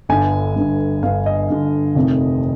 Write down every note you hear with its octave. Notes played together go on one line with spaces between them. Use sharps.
G1 G2 D3 G#5
G1 G2 D3
G1 G2 D3 F5
D#5
G1 G2 D3
F1 F2 C3 D#3